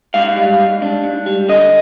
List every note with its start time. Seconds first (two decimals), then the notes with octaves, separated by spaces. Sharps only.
0.14 G#2 F5
0.36 G3
0.59 G#2
0.82 D4
1.04 G#2
1.26 G3
1.49 D3 D#5